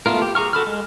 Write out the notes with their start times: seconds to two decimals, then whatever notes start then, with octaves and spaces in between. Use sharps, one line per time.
0.06 A3 B3 F4 A#4
0.22 G4
0.35 G#4 A#5 C#6 F6
0.53 F#4 A4 B5 F6
0.67 G#3